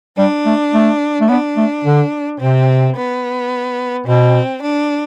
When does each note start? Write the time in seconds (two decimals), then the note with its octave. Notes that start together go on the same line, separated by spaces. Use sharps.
0.18 G3 D4
0.46 A3
0.74 A3
1.21 A3
1.29 B3 D4
1.57 A3
1.84 D3
2.40 C3 C4
2.96 B3
4.07 B2 C4
4.62 D4